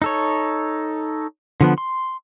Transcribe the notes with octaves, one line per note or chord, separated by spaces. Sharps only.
D#4 A4 C#5
D3 F3 B3
C6